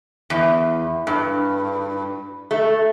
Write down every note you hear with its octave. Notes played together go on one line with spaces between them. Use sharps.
E2
G2
A3